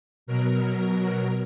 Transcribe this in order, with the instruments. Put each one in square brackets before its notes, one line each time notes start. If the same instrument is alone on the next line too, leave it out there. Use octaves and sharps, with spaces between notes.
[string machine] B2 F#3 A#4